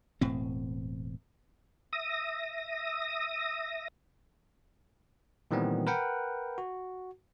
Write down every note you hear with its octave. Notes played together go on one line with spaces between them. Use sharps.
E1 A2 C4
E5 D#6 A#6
A#2 D#3 E3 G3 B3 C4
A#4 B4 F#5 G5
F#4